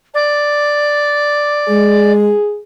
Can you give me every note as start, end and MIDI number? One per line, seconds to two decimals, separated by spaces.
0.14 2.12 74
1.68 2.25 56
1.68 2.59 68